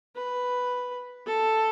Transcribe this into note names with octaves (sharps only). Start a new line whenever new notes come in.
B4
A4